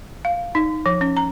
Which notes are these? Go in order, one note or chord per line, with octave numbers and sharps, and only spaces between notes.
F5
D#4
F3
C#4
A#5